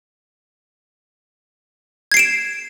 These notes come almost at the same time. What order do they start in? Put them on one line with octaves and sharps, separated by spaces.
G#6 C7 D7 E7